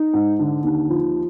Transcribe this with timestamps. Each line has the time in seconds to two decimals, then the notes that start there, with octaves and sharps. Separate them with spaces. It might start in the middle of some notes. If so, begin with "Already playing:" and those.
Already playing: D#4
0.13 G#2
0.39 D3
0.63 D#2
0.89 F3